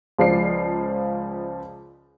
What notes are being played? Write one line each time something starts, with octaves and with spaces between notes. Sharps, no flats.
C#2 F3 D5 C7